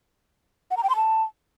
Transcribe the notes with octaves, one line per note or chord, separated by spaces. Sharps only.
F#5
A#5
G5
C6
A5